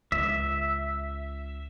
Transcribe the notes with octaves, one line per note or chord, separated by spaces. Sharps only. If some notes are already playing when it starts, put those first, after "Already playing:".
C#2 E5